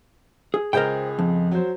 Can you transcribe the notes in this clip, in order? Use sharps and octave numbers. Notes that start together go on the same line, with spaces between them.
G#4
C#2 G#4 A#4 C5 G5 G6
F2
F#3 C5